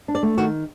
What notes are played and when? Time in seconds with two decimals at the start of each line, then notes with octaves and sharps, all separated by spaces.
0.08 D4
0.15 D5
0.23 A3
0.38 D#3 F#4